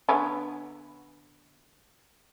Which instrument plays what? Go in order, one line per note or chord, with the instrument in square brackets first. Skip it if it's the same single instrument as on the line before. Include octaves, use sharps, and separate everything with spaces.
[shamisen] D3 B3 C#4